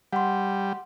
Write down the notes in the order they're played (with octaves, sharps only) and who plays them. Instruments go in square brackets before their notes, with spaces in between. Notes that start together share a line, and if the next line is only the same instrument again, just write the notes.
[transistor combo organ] G3 [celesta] F#5 C6